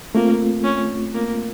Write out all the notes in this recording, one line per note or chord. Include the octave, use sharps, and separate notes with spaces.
A3 A#3 C4 F4
C#4
A#3